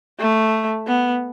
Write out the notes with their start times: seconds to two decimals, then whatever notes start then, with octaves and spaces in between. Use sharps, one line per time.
0.20 A3
0.87 B3